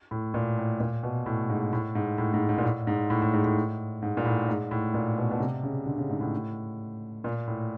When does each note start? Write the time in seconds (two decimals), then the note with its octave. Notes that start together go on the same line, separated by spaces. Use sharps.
0.11 A2
0.34 A#2
0.58 A2
0.80 A#2
1.03 B2
1.26 A2
1.49 G#2
1.73 A2
1.95 G#2
2.18 A2
2.34 G#2
2.49 G#2
2.58 A#2
2.64 A2
2.87 G#2
3.10 A2
3.22 A2
3.33 G#2
3.45 A2
4.02 G#2
4.17 A#2
4.25 A2
4.48 G#2
4.71 A2
4.94 A#2
5.17 B2
5.31 B2
5.40 C3
5.63 C#3
5.86 D3
5.98 C#3
6.09 G#2
6.21 A2
7.24 A#2
7.47 A2